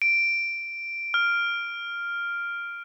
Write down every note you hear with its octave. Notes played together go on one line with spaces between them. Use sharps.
D7
F6